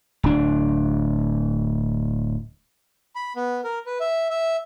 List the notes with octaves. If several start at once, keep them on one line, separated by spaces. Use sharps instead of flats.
D1 D4
B5
B3
A#4
B4
E5
E5